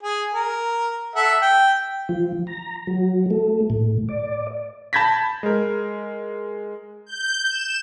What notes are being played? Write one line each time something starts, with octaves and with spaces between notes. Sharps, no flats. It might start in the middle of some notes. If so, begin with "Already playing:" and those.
G#4
A#4
A4 E5 F#5
G5
F3
A#5
F#3
A3
A2
D5
A5 B5 G6 G#6 A#6 B6
G#3 A#4
G6
E7